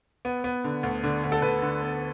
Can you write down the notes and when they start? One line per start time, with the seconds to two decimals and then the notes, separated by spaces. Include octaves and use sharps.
0.25 B3
0.44 B3
0.64 D3
0.83 D2
1.04 D3
1.24 D2
1.32 A4
1.42 D2 B4
1.62 D3
1.83 B3